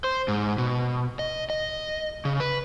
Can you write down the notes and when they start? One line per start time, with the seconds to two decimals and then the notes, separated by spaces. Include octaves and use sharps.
0.04 C5
0.28 G#2
0.58 B2
1.19 D#5
1.50 D#5
2.25 C#3
2.40 B4